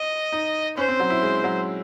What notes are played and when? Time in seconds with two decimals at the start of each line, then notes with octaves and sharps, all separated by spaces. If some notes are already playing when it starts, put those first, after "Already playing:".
Already playing: D#5
0.32 D#4
0.77 C#4 C5
0.88 C4
1.00 F#3
1.10 E4
1.22 G#3
1.44 F#3